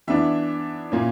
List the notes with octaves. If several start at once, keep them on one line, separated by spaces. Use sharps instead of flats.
E3 B3 D4 E5
A#2 A#3 C#4